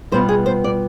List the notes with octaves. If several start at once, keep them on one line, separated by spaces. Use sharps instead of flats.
B2 G3 B3 F4 C5
G#4
C5
D5